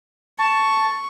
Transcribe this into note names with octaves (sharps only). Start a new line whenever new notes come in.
A5 C#6